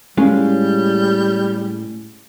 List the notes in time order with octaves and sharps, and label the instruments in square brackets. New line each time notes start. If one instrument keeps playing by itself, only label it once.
[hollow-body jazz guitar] A2 G#3 F4 [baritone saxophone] G3 [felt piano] C#4